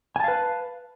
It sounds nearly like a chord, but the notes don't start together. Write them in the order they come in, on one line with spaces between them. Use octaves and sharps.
G#5 A5 F5 B4